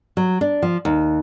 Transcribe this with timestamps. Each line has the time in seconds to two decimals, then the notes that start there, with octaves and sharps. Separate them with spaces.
0.17 F#3
0.41 D4
0.62 F3
0.85 D#2